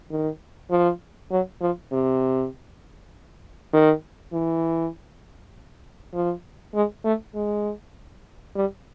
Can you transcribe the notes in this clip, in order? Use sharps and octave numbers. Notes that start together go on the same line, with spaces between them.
D#3
F3
F#3
F3
C3
D#3
E3
F3
G#3
A3
G#3
G3